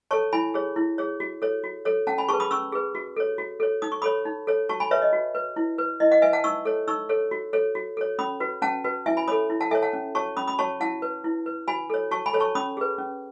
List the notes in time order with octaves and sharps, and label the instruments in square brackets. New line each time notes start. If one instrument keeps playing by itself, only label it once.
[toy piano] A4 C#5 A5 C#6
E4 G#5 B5
G#4 C#5
E4
G#4 C#5
F#4
A4 C#5
F#4
A4 C#5
C#4 F#5 A5
G#5 B5
G#4 A5 C#6
B4
B5 D#6
C#4 C#6 E6
G#4 B4
F#4
A4 C#5
F#4
A4 C#5
D#4 D#6
C#6
A4 C#5 B5 D#6
D#4
A4 C#5
F#4 A5 C#6
G#5 B5
B4 C#5 E5
D#5
F#4
B4
E4
B4
E4 D#5
D#5 F#5
B4 E5 G#5
F#5 A5
D#4 C#6 E6
A4 C#5
D#4 C#6 E6
A4 C#5
F#4
A4 C#5
F#4
A4 C#5
C#4 B5 D#6
F#4 B4
C#4 F#5 A5
F#4 B4
E4 E5 G#5
G#5 B5
A4 C#5 B5 D#6
E4
F#5 A5
A4 E5 G#5
C#5
F#5 A5
C#4
F#4 C#5 A5 C#6
C#4 B5 D#6
B5 D#6
F#4 C#5 A5 C#6
E4 F#5 A5
B4
E4
B4
F#4 G#5 B5
A4 C#5
F#4 A5 C#6
G#5 B5
A4 C#5
A5 C#6
C#4 B5 D#6
G#4 B4
C#4